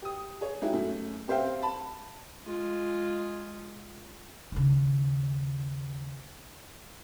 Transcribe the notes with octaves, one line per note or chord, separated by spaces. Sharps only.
G4 D#6
G#4 C#5
F#3 G#3 D#4 E4 F#4 G4
F#2 A3
C4 G4 C5 E5 F5 G5
A5 B5
G#3 F4
D#2 C#3